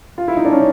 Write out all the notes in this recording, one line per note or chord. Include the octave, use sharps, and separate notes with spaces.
F4
E4
D#4
D4
C#4